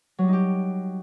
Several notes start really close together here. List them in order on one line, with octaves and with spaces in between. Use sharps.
F#3 G3 D#4 G4